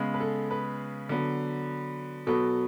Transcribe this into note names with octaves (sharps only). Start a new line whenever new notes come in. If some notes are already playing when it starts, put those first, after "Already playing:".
Already playing: C#3 G#3 B3
B4
A4
B4
D3 F#3 B3
B2 F#3 B3 A4